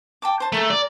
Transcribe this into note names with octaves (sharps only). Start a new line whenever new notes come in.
G5 A5 D6
C5 A5
A3 G#4 A#4 A#5
D5